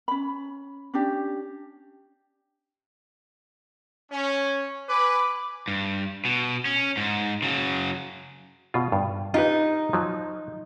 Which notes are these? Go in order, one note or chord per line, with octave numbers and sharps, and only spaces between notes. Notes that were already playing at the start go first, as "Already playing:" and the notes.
C#4 B5
C#4 D4 G4
C#4
B4 G#5 D6
G2
B2
C#4
G#2
C#3 F#3
B2 F4
G2
D#4 F4 G4 B4
F3 F#3